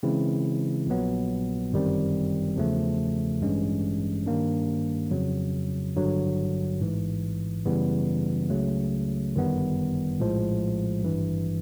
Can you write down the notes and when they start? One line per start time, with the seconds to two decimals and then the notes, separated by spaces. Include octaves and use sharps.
0.03 C#3 E3 G#3 C4 E4
0.87 A#1 A#2 F#3 B3
1.72 G1 F#2 D#3 G3 C4
2.56 E2 C#3 F3 A3
3.41 A1 G2 E3 G#3 C#4
4.26 G2 D#3 G3 A#3 D4
5.11 F2 C#3 F#3
5.96 G#1 G2 D3 F#3
6.80 A1 G#2 E3
7.65 F#2 C#3 E3 G3 B3
8.50 C#2 C#3 F#3 A3
9.35 G1 F#2 D#3 G3 B3
10.20 A#1 A2 F3 G#3
11.04 G#1 G2 E3